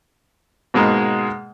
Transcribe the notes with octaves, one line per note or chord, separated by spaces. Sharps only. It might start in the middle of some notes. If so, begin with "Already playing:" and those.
G#2 B2 G#3 A#3